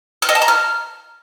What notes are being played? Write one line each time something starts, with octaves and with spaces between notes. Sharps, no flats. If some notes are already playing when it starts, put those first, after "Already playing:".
F6
D#5
A5
A#5
F6